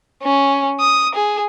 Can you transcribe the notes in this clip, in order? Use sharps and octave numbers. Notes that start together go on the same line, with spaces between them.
C#4
D#6
G#4